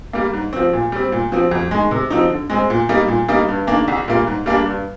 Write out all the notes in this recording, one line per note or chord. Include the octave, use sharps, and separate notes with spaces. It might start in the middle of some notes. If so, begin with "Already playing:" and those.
G3 A#3
G#2
F3 C4
A#2
G3 C4
A#2
F3 C4
F2
D#3 G#3
C3
F3 C4 D#4
D3
G#3 C4
A#2
G3 A#3 D#4
A#2
G3 A#3 D#4
G2
D#3 A#3 D4
C2
A#2 G3 A#3
G#2
G3 A#3 D4
G2